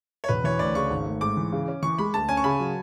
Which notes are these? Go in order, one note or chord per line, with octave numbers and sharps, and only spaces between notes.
C#5
E1 B4
E3 C#5
D2 D5
C#3 C#6
G#1
A3
G#2 D6
E3
C#3
C#4
E3 C#6
G#3 B5
D2 A5
C#4 G#5
C#6
C#3 B5
F#3